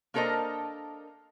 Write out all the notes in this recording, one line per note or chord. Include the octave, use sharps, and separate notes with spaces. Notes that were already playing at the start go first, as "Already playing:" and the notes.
A#3 D4 A4 A#4 C5 D#5